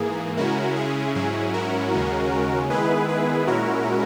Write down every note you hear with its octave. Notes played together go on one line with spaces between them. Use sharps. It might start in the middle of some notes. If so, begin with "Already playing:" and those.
Already playing: G#2 E3 A#3 G#4
C#3 G#3 C#4 E4 F#4 A#4
G#4
G#2 F#3 C#4 E4 G#4
F#4 A#4
D#2 C#3 G#3 C#4
D#3 G#3 B3 E4 G#4 B4
G#4 B4
A#2 G#3 C#4 E4 F#4 A#4